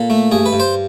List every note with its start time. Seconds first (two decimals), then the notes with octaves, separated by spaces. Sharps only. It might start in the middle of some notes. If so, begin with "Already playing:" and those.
Already playing: A#2 A4
0.10 A3
0.32 G2 G#4
0.46 B4
0.53 G2
0.60 C5